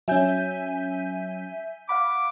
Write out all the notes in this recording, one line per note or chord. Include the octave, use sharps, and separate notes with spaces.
F#3 C#4 E5 G#5 G6
F5 F#5 B5 D6